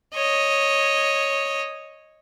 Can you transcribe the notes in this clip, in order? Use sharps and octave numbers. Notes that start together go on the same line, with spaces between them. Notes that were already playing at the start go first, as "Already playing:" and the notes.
C#5 D#5